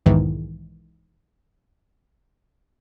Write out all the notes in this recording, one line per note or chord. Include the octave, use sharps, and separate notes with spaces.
B1 E2 G#2 D#3 E3